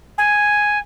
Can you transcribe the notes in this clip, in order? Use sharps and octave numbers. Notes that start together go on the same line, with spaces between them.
G#5